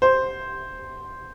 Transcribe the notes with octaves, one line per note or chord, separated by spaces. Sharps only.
C5